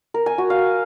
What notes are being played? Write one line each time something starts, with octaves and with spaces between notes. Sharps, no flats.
A#4
G#5
F#4
F5